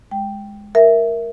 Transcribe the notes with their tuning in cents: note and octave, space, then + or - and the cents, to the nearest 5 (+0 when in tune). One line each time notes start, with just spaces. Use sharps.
G#3 +0 G5 +0
A#4 +0 E5 +0